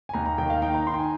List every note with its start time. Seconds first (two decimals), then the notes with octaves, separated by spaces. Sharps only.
0.09 G#5
0.14 D#2 A#5
0.26 A#5
0.38 D#3 G5
0.50 F5
0.62 D#4 G5
0.74 A#5
0.87 D#4 C6
0.94 G5
0.99 G#5